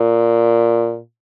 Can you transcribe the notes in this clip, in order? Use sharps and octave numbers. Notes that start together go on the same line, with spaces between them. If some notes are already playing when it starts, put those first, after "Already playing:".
Already playing: A#2